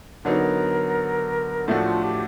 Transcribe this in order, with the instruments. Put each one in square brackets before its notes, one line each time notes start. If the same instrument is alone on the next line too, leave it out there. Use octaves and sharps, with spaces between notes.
[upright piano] D3 F#3 B3 D#4 [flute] A#4
[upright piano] A2 F3 A3 D4 F#4 [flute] A4
[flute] F4
G4